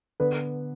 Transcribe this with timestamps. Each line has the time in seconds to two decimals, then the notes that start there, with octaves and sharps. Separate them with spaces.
0.20 D3 B3 B4